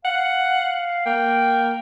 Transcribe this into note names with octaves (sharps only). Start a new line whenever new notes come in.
F5 F#5
A#3 G5